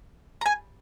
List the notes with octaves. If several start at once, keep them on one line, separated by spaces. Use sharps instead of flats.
A#5
G#5